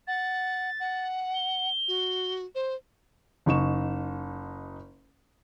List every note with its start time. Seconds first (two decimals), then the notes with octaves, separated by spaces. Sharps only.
0.08 F#5 A6
0.80 F#5
1.35 G7
1.88 F#4
2.55 C5
3.46 F#1 D#4 C#6 E7